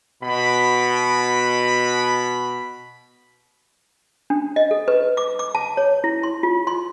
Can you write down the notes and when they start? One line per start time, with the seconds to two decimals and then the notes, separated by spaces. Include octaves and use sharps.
0.23 B2 B5
4.30 D4
4.56 D#5
4.71 A4
4.88 B4
5.17 D6
5.39 D6
5.55 A5
5.77 C#5
6.04 E4
6.23 C6
6.43 F4
6.67 C6